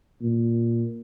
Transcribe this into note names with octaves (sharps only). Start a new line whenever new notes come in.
A#2